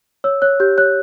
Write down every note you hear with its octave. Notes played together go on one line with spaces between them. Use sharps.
C#5 E6
C#5 F#6
G4 G6
C#5 F#6